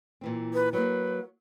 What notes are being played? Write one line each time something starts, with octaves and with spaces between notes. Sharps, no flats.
A#2 E3 C4
B4
F#3 A#3 B4